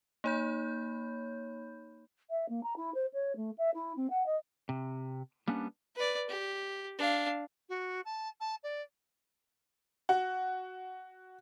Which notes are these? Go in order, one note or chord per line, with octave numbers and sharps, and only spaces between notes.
A#3 D#4 C#5 B5 G6
E5
A#3
A#5
E4
C5
C#5
A3
E5
E4
C4
F#5
D#5
C3
G3 A#3 B3 C#4 D4
B4 D5
G4
D4 F5
F#4
A5
A5
D5
F#4